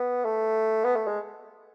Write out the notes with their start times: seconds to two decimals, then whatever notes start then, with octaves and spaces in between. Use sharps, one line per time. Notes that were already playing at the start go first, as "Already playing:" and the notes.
Already playing: B3
0.25 A3
0.85 B3
0.96 A3
1.07 G#3